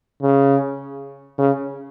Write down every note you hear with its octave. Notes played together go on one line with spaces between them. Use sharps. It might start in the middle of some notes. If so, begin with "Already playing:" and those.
C#3
C#3